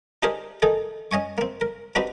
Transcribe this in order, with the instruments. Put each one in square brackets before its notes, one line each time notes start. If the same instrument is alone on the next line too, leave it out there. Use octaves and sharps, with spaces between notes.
[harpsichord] D4 D#4 G4 G#4 A#4 C5
D#3 D#4 G#4 A4
C#4 D#5 G#5 C#6
A#3 C4
A#4
C4 D4 D#4 F#4 G4 B4